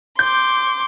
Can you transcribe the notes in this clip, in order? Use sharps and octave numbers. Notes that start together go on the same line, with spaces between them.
C6 D6 G6